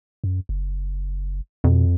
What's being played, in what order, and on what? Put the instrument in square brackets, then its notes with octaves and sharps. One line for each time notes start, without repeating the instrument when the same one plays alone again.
[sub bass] F#2
F#1
[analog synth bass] F2 [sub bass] B2